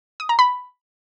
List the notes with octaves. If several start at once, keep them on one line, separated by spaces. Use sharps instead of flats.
D#6
A#5
B5